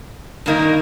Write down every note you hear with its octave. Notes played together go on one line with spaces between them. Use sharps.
G2 D#3 A#3 D#4